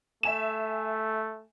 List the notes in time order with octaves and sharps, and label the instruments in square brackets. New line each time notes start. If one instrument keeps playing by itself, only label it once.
[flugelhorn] A3 [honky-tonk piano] E5 G#5 E7